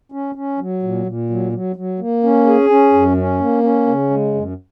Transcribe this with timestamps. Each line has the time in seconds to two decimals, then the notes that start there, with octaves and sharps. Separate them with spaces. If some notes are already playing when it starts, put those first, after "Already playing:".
0.12 C#4
0.35 C#4
0.59 F#3
0.83 A#2
1.06 A#2
1.30 F#3
1.52 F#3
1.76 F#3
1.99 A#3
2.23 C#4
2.46 G#4
2.70 C#4
2.93 F#2
3.17 C#4
3.41 A#3
3.63 C#4
3.87 C#3
4.10 G#3
4.34 F#2